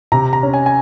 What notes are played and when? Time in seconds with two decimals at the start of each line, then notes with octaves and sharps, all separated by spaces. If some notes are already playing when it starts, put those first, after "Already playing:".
0.12 C3 A#5
0.33 A#5
0.43 C#4
0.53 G#5
0.66 G#5